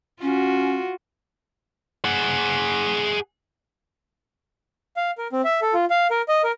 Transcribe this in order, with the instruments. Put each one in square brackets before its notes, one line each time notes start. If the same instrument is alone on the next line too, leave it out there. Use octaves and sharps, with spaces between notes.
[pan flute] C#4 [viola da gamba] F4 F#4
[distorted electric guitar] G#4 F#5
[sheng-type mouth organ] F5
A#4
C4
E5
A4
F4
F5
A#4
D#5
A#4